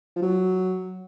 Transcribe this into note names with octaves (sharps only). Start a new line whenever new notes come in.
F3
F#3